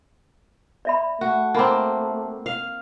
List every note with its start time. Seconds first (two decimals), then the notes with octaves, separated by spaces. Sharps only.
0.85 D5 E5 B5
1.21 A3 F#4
1.54 A#3 C4 D#4 B5 D6
2.46 F5